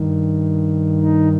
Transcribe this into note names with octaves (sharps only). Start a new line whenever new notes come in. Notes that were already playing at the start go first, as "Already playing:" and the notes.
Already playing: G2 D#3
D#4